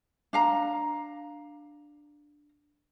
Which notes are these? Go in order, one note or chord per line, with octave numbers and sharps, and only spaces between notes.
D4 F5 A#5